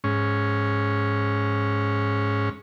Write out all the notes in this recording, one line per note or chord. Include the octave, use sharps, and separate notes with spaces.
G#2 C#4